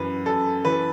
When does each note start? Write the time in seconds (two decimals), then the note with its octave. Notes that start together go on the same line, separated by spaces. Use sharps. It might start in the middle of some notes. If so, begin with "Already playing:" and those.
Already playing: F#2 E3 B4
0.26 F#2 A4
0.65 E3 B4